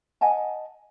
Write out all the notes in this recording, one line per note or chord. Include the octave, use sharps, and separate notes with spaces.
D#5 F#5 G#5 A5